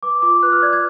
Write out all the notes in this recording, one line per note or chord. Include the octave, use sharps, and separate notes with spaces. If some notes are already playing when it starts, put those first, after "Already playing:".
B4 D6
F4 D6
B4 F#6
F6
D5 G#6
G#6